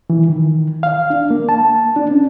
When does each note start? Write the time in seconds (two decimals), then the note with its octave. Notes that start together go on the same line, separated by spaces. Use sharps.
0.10 E3
0.30 D#3
0.83 F5
1.10 D4
1.30 A#3
1.49 A5
1.96 D4
2.11 C#4